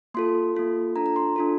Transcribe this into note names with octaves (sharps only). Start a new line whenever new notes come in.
A#3 F4 A4 C6
A#3 F4 A4
D4 F4 A4 A#5
A#5
C6
D4 F4 A4